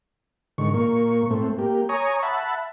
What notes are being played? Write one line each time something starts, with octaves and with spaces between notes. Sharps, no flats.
G#2 D3 D#3 C#6
A#2 A#3 C#6
A2 A3 C4
A#3 G4
C#5 G#5 A#5 C#6 D#6
E5 F#5 A5 B5